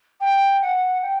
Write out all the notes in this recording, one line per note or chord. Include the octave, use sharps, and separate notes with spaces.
G5
F#5
G5